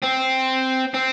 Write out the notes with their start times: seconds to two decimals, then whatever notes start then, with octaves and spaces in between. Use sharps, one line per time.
0.03 C4
0.94 C4